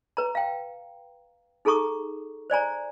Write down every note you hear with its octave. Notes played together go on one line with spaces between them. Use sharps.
B4 A#5
F5 G5
D#4 G#4 A4 A#5 C#6 D#6
C5 D5 G#5 A#5